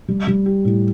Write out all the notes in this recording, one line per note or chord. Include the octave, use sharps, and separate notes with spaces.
G3
G3
G4
A2